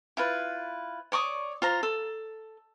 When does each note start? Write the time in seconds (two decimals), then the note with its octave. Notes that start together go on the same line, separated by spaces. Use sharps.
0.17 E4 F4 B4
1.12 C#5 D5 C#6 D#6
1.62 F4 C5 A#5
1.83 A4